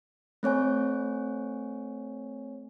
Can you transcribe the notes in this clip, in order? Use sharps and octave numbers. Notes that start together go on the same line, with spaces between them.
A3 C4 C#5 G#5